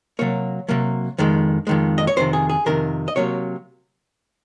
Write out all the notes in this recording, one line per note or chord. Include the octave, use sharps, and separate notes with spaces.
C3 F#3 A#3 C#5
C3 F#3 A#3
F2 D#3 G#3
F2 D#3 G#3
D#5
C#5
F2 C3 D#3 C5
G#4
G#4
F2 C3 D#3 A#4
D#5
C3 F#3 A#3 C#5